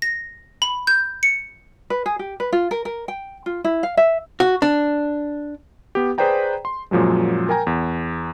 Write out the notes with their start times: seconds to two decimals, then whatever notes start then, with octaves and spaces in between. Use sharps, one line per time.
0.02 A#6
0.62 B5
0.87 G6
1.23 C#7
1.90 B4
2.06 G#4
2.19 G4
2.40 B4
2.52 F4
2.71 A#4
2.85 A#4
3.08 G5
3.46 F4
3.64 E4
3.83 F5
3.97 E5
4.40 F#4
4.62 D4
5.95 B3 G4
6.18 G#4 B4 C5 D5 G5 A#5
6.65 C6
6.91 F#2 A#2 F3 F#3 G#3
7.49 A#4 G5 G#5 A#5
7.67 E2